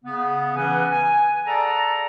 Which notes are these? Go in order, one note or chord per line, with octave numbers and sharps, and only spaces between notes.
C#3 B3
C#3 E3 C#4 B4 F#5 G#5
G#5
G#4 A4 D5 F#5 A5 A#5